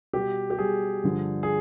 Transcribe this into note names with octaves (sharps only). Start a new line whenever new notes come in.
B2 G3 G4
G4
B2 G3 G#4
G2 D3 F3
G#4